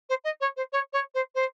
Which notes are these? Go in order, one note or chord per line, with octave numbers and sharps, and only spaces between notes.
C5
D#5
C#5
C5
C#5
C#5
C5
C5